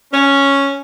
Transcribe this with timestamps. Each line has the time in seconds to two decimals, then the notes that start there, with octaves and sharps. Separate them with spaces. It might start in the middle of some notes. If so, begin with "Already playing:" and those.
0.13 C#4